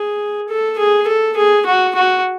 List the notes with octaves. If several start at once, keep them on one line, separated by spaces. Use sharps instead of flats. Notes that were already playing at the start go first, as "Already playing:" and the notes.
Already playing: G#4
A4
G#4
A4
G#4
F#4
F#4